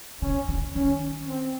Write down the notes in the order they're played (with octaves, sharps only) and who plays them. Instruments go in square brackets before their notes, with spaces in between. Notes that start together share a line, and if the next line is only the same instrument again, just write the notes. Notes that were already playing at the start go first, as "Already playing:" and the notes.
[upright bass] C#3 [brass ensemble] C#4
[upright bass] D3
[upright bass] D#3 [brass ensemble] C#4
[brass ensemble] C4